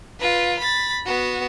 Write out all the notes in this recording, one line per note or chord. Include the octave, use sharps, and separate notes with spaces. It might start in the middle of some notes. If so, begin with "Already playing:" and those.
F4 B4
B5 A6
B3 F#4